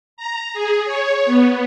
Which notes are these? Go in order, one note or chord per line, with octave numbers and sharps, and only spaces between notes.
A#5
G#4
C#5
B3